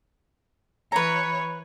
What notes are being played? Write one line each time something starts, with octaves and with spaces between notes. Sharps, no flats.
E3 B4 C#5 A#5